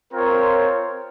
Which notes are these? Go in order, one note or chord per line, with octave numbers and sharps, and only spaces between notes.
C4 F4 A#4 C#5